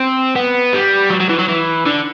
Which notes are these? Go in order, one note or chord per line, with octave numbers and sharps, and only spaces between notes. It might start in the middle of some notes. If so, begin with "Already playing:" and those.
Already playing: C4
B3
G3
F#3
F#3
E3
F#3
E3
D3